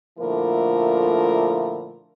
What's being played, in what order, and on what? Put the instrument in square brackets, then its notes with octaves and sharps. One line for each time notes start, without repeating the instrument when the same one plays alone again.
[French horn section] A#2 D3 F3 A3 E4 A#4